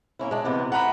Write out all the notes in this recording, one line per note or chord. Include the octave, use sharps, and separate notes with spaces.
A#3 C#4 E4
G#3 D4
C3 E3 B3
A3 F#5 A#5 B5